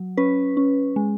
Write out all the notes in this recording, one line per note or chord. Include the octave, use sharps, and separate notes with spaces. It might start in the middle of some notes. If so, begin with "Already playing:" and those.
Already playing: F#3
C#4 B4
C#4
G#3